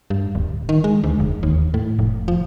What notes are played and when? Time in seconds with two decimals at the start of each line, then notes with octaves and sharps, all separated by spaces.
0.10 G2
0.35 D1
0.69 D#3
0.84 G#3
1.04 D2
1.20 F1
1.43 D#2
1.74 A2
1.99 F1
2.28 F3